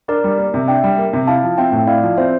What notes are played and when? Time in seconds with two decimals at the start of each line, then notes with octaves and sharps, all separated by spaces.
0.08 D4 A#4 D5
0.24 G3
0.38 A#3
0.54 C3
0.68 D4 E5 G5
0.84 G3
0.98 A#3
1.13 C3
1.27 E4 F5 A5
1.43 F3
1.58 C4 E5 G5
1.72 A2
1.87 E4 D5 F5
2.03 F3
2.18 C4 C5 E5